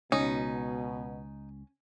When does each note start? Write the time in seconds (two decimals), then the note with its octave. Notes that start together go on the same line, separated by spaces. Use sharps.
0.12 C#2 B2 C#4 D#4